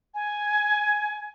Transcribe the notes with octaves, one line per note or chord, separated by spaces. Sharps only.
G#5